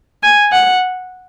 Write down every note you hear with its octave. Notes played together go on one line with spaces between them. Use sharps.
G#5
F#5